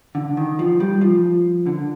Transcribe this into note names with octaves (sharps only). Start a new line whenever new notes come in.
D3
D#3
F3
G3
F3
D3